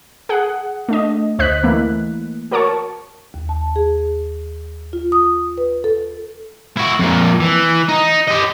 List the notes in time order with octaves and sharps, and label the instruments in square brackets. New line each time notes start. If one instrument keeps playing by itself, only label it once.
[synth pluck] G#4 F#5
A3 D4 D#5
D2 C5 D#5 F#6 B6
E3 A3 A#3 E4
F#4 A#4 C#5 A5 C#6
[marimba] D#2
A5
G#4
F4
D#6
B4
A4
[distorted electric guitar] E4 F#4
F2 A#2
E3
D#4
G4 D#5